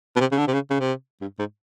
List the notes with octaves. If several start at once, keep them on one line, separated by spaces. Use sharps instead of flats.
B2
C3
C#3
D3
C3
C#3
C#3
C3
G2
G#2